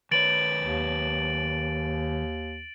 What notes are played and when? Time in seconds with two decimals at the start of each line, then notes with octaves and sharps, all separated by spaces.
0.11 D#3 B4 C#5 A6 D7 F#7
0.63 D#2